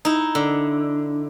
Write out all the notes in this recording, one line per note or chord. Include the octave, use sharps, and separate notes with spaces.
D#4 E4
D3